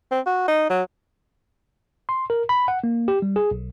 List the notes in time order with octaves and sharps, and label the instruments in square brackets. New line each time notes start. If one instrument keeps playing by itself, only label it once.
[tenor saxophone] C4
F#4
D#4
F#3
[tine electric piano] C6
A#4
B5
F#5
A#3
G4
G3
G#4
B1